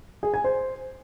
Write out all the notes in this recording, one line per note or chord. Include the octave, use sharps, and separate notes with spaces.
G#4
G#5
C5